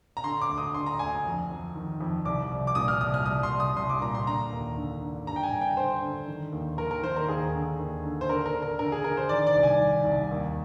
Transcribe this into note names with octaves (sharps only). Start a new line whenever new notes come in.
A#5
D3 C6
D6
D2
D#6
D3 C6
A#5
D2 G#5
F2
F2
D#3
F2
C2 D6
C2
D6
A#2 D#6
F6
C2 D#6
F6
C2 D#6
C6
C2
D#6
C2 C6
D6
A#2 A#5
C6
D3 A#5
D#2
D3
D3
G2 A#5
G5
G#5
G2
G5
D3 C5
D3
D#3
D#2
D#3 A#4
A#4
D#3 C5
A#4
D#2 G#4
D3
D#2
D3
C5
D3 A#4
A#4
D3
A#4
D3 A#4
G#4
D3 A#4
C5
D#3 D5
D5
C2
G#5
D#3
C2
D#2